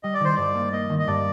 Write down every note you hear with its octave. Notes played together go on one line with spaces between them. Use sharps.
G3 D#5
D5
D#3 C5
G2 D5
A#3
A#3 D#5
D#3
D#5
G2 D5